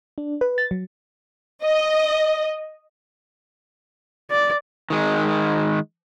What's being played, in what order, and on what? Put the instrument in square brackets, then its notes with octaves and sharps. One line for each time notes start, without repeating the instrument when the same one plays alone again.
[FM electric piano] D4
B4
A6
F#3
[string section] D#5
[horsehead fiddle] D5
[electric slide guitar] D#3 G#3